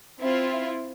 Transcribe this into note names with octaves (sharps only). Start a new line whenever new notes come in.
C4 E4 F4